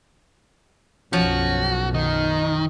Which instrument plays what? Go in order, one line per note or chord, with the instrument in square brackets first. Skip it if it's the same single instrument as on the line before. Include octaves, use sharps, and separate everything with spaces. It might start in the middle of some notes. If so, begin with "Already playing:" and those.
[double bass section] B1 F#2 [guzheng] F3 [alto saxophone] C#4 [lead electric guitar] F#4
[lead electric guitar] D#3 [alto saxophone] D#4